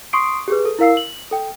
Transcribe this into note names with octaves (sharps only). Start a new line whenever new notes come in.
C6 C#6 D#6 C7 D7
G4 G#4 B4
A4
E4 A#4 F5 E6 C7
F#7
A4 G5